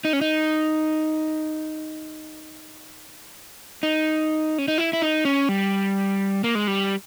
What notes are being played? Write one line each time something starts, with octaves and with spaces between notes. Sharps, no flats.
D#4
C#4
D#4
D#4
C#4
D#4
E4
E4
D#4
C#4
G3
A#3
G#3
G3